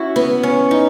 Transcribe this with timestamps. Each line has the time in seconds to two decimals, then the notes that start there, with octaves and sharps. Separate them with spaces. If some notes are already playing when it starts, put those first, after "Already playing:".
Already playing: C#4 E4 F#4
0.16 B3
0.43 C#4
0.71 D#4